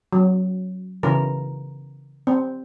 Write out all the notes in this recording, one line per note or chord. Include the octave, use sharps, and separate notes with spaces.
F#3
C#3 E3 A#4
C4